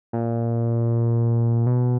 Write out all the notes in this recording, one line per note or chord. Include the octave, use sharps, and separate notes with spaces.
A#2
B2